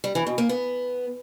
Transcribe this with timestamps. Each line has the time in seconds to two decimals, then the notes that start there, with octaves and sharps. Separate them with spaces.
0.04 G3
0.15 E3
0.27 B2
0.38 A#3
0.49 B3